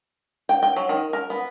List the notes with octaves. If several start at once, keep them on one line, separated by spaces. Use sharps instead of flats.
G5
G5
F#3
D#3
A#4
B3